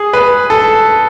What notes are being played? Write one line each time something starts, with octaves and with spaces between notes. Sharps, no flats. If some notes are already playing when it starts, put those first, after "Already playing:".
Already playing: G#4
B4
A4